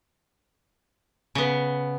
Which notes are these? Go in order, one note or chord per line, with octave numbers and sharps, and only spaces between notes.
C#3 B3